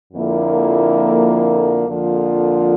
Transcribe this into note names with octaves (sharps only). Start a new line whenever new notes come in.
F2 D3 F3 A#3 E4
F2 D3 F3 A#3 F4